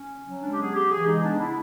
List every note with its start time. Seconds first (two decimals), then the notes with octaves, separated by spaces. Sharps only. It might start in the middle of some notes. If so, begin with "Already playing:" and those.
Already playing: C#4
0.10 C#3
0.26 F#3
0.42 G#3 D4
0.52 G4
0.58 B3 G#4
0.74 C#3 G4
0.91 E3 G#4
1.06 G#3 D#4
1.23 B3 D4
1.39 C#3 E4